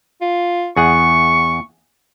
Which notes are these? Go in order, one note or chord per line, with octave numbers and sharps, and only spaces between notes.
F4
E2 G#4 F#5 C#6